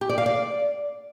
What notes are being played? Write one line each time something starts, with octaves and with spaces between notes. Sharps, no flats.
G4
D5
F5
D5